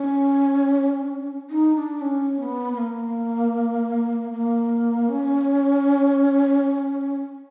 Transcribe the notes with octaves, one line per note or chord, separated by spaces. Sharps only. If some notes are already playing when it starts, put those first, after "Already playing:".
Already playing: C#4
D#4
D4
C#4
B3
B3
A#3
A#3
C#4